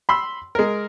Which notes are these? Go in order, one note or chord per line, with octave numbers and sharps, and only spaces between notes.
B5 C6 E6
G#3 A#4